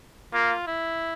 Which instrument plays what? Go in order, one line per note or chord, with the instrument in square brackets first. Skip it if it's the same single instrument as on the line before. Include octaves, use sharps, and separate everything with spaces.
[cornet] A#3 [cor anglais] F4
[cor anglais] E4